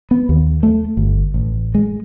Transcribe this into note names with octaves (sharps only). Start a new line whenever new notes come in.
B3
D#2
A3
G1
A1
G#3